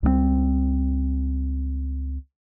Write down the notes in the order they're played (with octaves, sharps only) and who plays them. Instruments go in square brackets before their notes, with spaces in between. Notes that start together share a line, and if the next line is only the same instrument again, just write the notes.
[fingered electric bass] C#2 G3 A3 C4